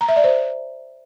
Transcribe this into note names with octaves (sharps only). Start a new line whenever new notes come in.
A#5
E5
D5
C5